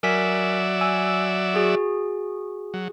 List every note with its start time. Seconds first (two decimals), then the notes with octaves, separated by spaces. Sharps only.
0.03 F#3 A#4 D5 E5 G#5 B6
0.81 G#5 E6
1.54 F#4 G#4
2.74 F#3